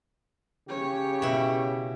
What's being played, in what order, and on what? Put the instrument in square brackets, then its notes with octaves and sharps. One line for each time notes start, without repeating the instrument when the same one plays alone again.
[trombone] C#3 [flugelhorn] G4 [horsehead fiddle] C#5
[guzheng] B2 E4